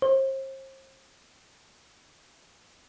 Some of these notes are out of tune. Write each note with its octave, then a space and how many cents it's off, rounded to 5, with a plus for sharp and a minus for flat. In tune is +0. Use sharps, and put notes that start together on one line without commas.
C5 +40